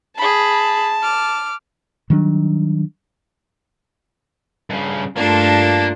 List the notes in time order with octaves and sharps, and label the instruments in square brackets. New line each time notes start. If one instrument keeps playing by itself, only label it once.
[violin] G#4 B5 [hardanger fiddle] A5
[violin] D6 F6
[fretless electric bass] D#3 F#3 G3 D4
[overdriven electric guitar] G2 C#3
[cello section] G2 A3 F4 [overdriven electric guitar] A#3 [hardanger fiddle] D4 A4